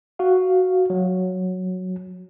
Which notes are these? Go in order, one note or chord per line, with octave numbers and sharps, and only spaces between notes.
F#4 F5
F#3